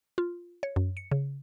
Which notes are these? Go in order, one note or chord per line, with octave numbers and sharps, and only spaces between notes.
F4
C#5
F#2
C#7
C#3